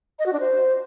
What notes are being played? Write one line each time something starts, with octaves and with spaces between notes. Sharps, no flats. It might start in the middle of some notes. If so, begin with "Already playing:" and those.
D#5
F#4
D4
C5